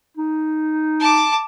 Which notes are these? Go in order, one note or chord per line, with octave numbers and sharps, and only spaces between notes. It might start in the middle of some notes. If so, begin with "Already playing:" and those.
D#4
A5 D6